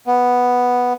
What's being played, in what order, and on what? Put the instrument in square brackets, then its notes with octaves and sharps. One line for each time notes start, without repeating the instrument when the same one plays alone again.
[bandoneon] B3